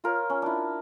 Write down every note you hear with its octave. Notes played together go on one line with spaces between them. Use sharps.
F4 A#4 C#5
C#4
D4 E4